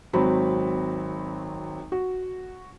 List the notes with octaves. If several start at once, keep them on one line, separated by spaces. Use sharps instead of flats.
G#1 F#3 C4 B5
F#4